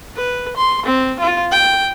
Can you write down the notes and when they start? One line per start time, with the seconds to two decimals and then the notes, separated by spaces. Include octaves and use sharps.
0.16 B4
0.56 C6
0.86 C4
1.20 F4
1.52 G5